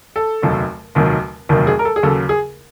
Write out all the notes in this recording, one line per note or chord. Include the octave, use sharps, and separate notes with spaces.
A4
F1 D#2 D#3 F#3
F1 D#2 D#3 F#3
F1 D#2 D#3 F#3
G#4
A#4
A4
G#4
D#2 C#3 F#3 A4
G#4